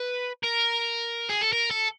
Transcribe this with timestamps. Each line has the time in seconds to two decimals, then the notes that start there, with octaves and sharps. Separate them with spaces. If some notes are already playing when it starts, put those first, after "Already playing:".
Already playing: B4
0.43 A#4
1.29 G#4
1.42 A4
1.53 A#4
1.71 A4